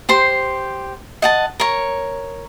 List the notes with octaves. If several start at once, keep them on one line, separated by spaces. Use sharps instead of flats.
G4 C5 C6
D#5 F#5 A5
A#4 C#5